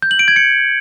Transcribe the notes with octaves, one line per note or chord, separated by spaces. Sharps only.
G6
F#7
D7
G#6
C#7